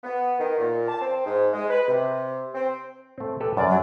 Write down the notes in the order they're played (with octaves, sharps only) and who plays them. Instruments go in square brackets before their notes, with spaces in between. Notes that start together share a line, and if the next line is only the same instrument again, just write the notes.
[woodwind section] B3
D#3
A#2
A5
C4
G#2
G#3
B4
C3
C4
[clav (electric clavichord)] A3 C4
G4 A4 B4
[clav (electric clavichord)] F#2 [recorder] D5
[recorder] F#3